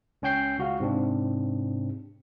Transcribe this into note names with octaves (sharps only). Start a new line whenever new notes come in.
C#2 C#4 C#5 G5 G6 C7
C#2 F#4 F5
G#2 C3 C4 D4